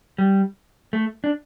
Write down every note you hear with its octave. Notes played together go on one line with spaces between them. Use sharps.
G3
A3
D4